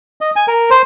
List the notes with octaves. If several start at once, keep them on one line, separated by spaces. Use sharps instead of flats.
D#5
G#5
A#4
C5